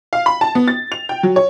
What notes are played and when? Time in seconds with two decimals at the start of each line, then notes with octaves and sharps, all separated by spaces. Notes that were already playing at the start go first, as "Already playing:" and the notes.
0.13 F5
0.26 B5
0.41 A5
0.55 B3
0.68 A6
0.92 F7
1.09 G5
1.23 F#3
1.36 C#5